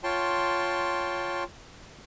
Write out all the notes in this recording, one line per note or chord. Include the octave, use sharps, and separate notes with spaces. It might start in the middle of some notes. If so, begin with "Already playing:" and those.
F4 C#5 G5 A5 C6